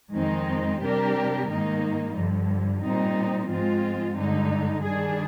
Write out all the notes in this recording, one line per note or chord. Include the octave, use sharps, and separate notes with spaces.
F2 D#3 G#3 C4 D#4
C3 G3 D4 G4 A#4
G#2 D#3 A#3 D#4
G2 D3 F3
A#2 G3 C4 D#4
G#2 F3 G#3 C4 F4
G2 D3 G#3 D#4
D#3 G3 D4 G#4